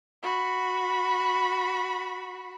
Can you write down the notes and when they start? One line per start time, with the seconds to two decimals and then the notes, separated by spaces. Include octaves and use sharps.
0.23 F#4 B5